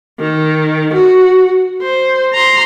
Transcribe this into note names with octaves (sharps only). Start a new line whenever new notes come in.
D#3
F#4
C5
A#5 C6